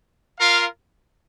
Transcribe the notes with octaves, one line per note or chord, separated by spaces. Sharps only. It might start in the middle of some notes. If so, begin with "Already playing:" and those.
F4 A#4 F5